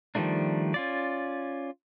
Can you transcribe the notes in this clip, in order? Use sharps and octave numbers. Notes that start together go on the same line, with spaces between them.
D#3 F3 G3 A3 D4
C#4 F4 D5